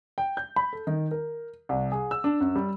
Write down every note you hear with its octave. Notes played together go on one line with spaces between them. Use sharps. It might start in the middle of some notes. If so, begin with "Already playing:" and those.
G5
G6
B5
A4
D#3
A#4
C2
G#4
E6
D4
F#2
G3